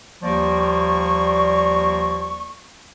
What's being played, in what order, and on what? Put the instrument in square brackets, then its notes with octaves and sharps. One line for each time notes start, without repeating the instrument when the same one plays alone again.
[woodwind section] D#2 F3 G3 A#3 D5 C#6